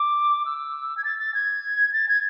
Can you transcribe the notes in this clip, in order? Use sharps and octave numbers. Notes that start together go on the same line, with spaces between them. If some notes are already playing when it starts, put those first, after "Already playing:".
Already playing: D6
E6
G#6
A6
A6
G#6
A6
G#6